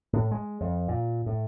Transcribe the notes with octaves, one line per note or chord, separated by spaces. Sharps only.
A2
G#3
F2
A#2
A2